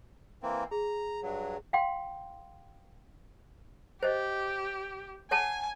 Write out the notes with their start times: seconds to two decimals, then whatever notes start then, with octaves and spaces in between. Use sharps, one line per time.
0.43 E3 A#3 C4
0.71 G#4 A#5
1.23 G2 F#3
1.73 F5 G5 C6
4.03 G4 C5 D#5
5.31 C#5 F#5 G#5 A5